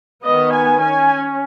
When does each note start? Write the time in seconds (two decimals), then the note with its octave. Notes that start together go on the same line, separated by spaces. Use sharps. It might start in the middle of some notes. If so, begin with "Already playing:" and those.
0.24 D#3 B3 D#5
0.53 G#5
0.81 C#4 G#5